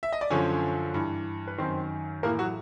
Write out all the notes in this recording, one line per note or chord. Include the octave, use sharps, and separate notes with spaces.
E5
D#5
D5
F#2 D3 F3 C#4 C#5
G2 E3
B4
F#2 D#3 C4 C5
A2 E3 A#3 A#4
F#3 F#4